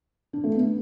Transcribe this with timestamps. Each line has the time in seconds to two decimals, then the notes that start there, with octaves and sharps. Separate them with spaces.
0.33 D4
0.44 A3
0.54 B3